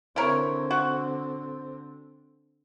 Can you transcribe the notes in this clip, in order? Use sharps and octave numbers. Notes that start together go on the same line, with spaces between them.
D3 C4 E4 A#4 C#5
F#4